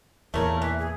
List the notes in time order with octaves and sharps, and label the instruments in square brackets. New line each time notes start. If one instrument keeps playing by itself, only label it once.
[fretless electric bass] E2 A#2 [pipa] A3 C#5 [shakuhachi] A#4
[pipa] E3 [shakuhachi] E5
[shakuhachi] G#4